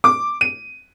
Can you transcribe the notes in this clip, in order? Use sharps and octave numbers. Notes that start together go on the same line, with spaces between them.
D6
D#7